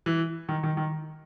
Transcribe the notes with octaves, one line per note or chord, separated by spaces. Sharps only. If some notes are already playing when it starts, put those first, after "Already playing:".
E3
D#3
D#3
D#3